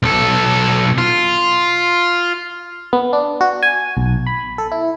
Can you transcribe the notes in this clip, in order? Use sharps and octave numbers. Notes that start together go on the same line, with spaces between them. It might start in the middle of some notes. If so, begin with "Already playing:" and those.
B1 A4
F4
B3
D4
F#4
G#5
B1
B5
A4
E4